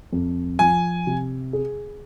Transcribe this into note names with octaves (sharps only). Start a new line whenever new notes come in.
F2
F3 G#5
C3
G#4